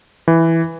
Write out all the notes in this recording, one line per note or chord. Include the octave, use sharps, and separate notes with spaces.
E3